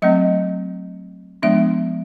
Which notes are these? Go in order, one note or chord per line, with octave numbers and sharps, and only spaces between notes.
F#3 A3 C4 D#5
F3 G#3 B3 D4 E5